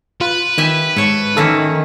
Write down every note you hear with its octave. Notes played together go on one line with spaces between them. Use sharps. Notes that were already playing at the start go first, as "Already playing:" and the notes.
F4 B4
D#3 G4 E5 G#5
G#2 A4 C#5
D#3 A#3 C#4 E4 A4